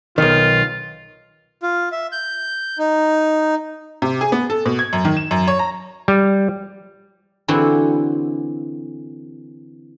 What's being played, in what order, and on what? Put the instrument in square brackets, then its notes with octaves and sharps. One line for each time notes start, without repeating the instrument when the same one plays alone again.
[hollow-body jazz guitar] B1 D#3 [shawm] F4
[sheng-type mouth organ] F4
E5
G6
D#4
[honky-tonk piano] C3
G#4
B3
A4
B2
G#6
F#2
D#3
E7
F#2
C#5
A#5
[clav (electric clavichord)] G3
[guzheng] D3 E3 C4 E4 F#4